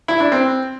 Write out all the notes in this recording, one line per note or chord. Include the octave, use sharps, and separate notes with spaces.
E4
D4
C4